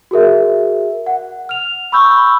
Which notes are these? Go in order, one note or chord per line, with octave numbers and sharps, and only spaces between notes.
F#4 G#4 A#4 E5
F#5
F6 F7
B5 C#6 E6 G6